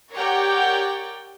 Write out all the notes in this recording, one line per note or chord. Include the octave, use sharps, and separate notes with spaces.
G4 A#4 C#5 D5 F#5 G5